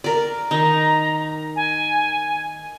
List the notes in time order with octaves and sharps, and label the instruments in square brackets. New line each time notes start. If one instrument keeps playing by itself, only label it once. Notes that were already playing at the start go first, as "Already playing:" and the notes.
[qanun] A#4 D5
[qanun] D#3 D#4 [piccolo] A#5
[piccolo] G#5